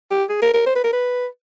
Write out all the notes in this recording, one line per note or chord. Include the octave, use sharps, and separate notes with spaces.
G4
G#4
A#4
A#4
C5
B4
A#4
B4